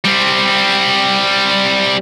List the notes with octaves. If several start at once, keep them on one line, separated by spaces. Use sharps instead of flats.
G3 C4